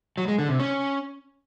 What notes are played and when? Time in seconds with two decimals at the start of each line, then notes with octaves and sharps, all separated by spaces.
0.18 F#3
0.28 G#3
0.39 D3
0.49 C3
0.60 C#4